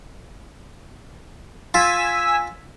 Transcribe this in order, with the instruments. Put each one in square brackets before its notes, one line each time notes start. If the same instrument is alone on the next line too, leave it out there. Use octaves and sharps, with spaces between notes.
[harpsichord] F4 [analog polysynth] G#5 E6 B6